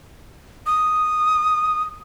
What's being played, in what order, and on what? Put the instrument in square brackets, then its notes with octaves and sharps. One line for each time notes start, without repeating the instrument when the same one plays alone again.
[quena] D#6